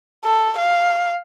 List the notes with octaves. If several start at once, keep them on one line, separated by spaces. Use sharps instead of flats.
A4
F5